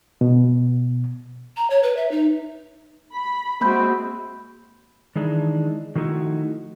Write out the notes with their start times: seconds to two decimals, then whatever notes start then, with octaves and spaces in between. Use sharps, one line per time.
0.21 B2
1.57 A#5
1.70 C#5
1.83 B4
1.97 E5
2.11 D#4
3.14 B5
3.61 G#3 A#3 C4 F#4 B5 G6
5.16 D#3 E3 G#3 D4 D#4
5.95 D#3 F3 A3 D#4 E4 F#4